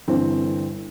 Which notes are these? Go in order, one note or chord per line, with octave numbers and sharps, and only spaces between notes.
G1 E3 C4